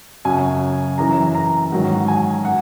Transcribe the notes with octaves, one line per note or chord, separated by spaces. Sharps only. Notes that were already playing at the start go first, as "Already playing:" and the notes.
F#2 C#3 F#3 G#5
F#2 E3 A#5
A#5
G#2 D#3 F#3
G#5
F#5